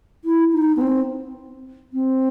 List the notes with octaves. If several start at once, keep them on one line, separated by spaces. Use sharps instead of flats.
E4
D#4
B3
C4
C4